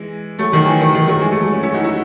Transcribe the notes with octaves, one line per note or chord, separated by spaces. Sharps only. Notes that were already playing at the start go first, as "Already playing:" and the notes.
Already playing: E3 G#3
F#3 A3
D#3 F#3
E3
D#3
D#3
D#3 F#3
E3 G#3
F#3 A3
F#3 A3
A3 C#4
C#4 E4
D#4 F#4
C#4 E4